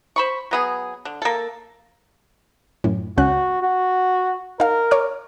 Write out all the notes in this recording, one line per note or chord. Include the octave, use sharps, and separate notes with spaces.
C5 B5 C#6
F#3 B3 G#4
D3
A#3 A4
F#2 A2
C#2 C#4 F#4 F#6
F#4
D#4 A#4 F5
C#5 D6 F6